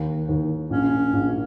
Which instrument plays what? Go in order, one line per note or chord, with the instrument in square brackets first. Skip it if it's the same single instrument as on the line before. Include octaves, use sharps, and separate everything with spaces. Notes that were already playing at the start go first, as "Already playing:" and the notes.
Already playing: [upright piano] D#2
D#2
[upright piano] A#1 [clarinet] C#4
[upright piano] A#1